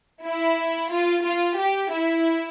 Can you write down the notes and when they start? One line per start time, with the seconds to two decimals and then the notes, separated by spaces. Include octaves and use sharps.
0.24 E4
0.92 F4
1.25 F4
1.58 G4
1.92 E4